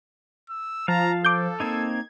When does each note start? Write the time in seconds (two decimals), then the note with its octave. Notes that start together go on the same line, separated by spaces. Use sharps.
0.50 E6
0.88 F3 F5 A5 A#5
1.24 A4 D6 G6
1.60 A#3 C4 D#4 G#6